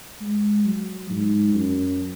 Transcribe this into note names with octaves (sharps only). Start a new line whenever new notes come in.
G#3
F#3
G#2
F#2